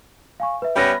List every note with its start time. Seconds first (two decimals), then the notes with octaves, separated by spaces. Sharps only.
0.40 F5 G#5 C#6
0.62 B4 E5
0.76 G3 B3 C#4 B5 A#6